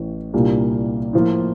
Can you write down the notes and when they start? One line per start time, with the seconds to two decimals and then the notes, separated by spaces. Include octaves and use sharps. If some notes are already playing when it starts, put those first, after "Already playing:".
Already playing: A1 A2
0.33 C2 A#2 G3 A#3 D4
1.13 A2 F3 A#3 F4